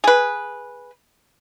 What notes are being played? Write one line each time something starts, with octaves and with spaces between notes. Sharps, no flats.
G#4 B4